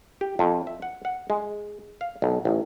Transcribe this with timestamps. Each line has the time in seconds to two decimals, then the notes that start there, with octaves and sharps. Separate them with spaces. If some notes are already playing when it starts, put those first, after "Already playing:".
0.21 G4
0.39 F2
0.67 E5
0.82 F#5
1.05 F#5
1.30 G#3
2.01 F5
2.22 B1
2.45 A1